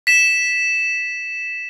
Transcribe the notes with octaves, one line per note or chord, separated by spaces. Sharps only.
B6 E7